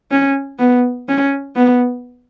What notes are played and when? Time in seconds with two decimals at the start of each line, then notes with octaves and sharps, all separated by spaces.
0.11 C#4
0.59 B3
1.08 C#4
1.56 B3